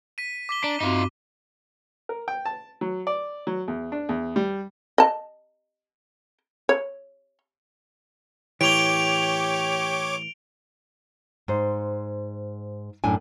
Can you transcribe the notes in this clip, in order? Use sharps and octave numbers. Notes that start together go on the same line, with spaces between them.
B6 D#7
D6 B6 G7
D4 A#5
G2 C4 D#4 F4 F#4
A#4
G5
A5
F#3
D5
F#3
E2
D4
E2
G3
D#5 A5
C#5
A2 E3 G4 C#5 D6 D7 F7 G7
G#2 C5
F#2 A2 D4 G#5